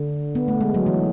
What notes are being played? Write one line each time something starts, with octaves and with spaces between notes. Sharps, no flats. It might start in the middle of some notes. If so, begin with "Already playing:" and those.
Already playing: D3
B3
A3
G#3
F#3
E3